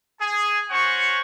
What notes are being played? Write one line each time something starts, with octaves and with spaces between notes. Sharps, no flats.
G#4 G#5
C#4 F#4 C5 C#5 F#5 C#6